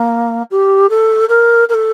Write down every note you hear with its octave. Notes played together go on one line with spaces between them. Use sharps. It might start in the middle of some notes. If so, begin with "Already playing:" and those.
Already playing: A#3
G4
A4
A#4
A#4
A4